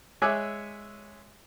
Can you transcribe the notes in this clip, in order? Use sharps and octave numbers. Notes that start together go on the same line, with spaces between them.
G#3 C#5 E5 G#5 D6 F#6